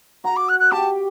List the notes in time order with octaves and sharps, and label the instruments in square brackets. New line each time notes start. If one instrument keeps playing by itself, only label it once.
[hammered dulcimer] F#4 F#5 [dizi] A#5
[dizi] D6
F#6
F#6
[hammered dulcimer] G4 G5 [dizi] A5